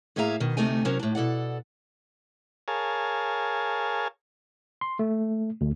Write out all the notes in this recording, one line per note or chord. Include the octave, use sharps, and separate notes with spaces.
A2 A#3 G#4 E5 F5 A#5
B2 D#3
D2 C3 A3 D#4 G#5
C3 F#3 C#4 A#4
A2 D4
B2 A4 D5 F#5
G#4 A#4 C#5 F5 G#5 A5
C6
A3
D2